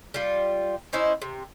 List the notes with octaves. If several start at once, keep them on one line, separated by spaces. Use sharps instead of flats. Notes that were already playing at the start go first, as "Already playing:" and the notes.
G3 F4
C#4 D#4 E4 C5
C3